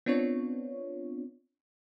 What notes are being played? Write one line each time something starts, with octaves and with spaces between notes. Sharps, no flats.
B3 C4 D4 F4 C#5